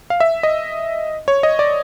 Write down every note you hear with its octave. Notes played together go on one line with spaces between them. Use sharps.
F5
E5
D#5
C#5
D#5
D5